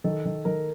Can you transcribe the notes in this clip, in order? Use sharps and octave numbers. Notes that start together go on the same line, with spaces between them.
D#3 A4
D#3
D#3 A#4